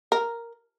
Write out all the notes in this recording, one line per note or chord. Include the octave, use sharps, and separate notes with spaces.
A#4